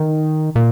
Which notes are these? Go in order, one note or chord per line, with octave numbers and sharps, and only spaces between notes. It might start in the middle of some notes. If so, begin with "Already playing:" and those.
Already playing: D#3
A#2